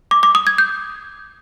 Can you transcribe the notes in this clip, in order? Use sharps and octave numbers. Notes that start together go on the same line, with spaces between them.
D6
D6
D#6
G#6
G6